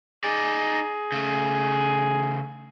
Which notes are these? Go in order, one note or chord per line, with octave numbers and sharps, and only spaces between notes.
D#4 G#4 D5
C#3 A3